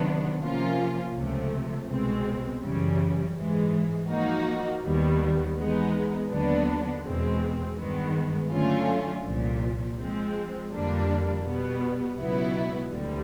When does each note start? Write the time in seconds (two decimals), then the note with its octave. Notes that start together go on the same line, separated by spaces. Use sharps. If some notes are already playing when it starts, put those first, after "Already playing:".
Already playing: C3 D#3 F#3 B3 D4
0.41 C3 F3 A#3 C#4 F4
1.15 C#2 C3 F3 A3
1.88 C2 B2 G#3 C4
2.62 F#2 C#3 E3 G3
3.36 G#2 E3 G#3
4.09 F3 A#3 D#4 F#4
4.83 D#2 D#3 G3 B3
5.57 E3 G#3 B3 D#4
6.30 D#2 D3 F#3 B3 D4
7.04 E2 B2 G#3 C4
7.77 G2 D#3 G#3 B3
8.51 D3 F#3 A3 C#4 F4
9.24 C2 A#2 F3
9.98 F3 G#3 C4
10.71 F2 D3 G3 A#3 D4
11.45 B2 G3 B3
12.19 C#2 B2 F#3 B3 E4
12.92 D2 D3 G3